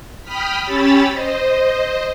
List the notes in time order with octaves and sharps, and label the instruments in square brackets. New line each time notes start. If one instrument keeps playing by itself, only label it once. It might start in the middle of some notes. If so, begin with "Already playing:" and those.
[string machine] G5 B5 D#6 F6 B6
C#4 G4 C#5 B5 E6 A6
C5 D#5